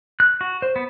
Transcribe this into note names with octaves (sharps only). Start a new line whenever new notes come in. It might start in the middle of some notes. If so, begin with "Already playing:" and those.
F#6
F#4
C5
B3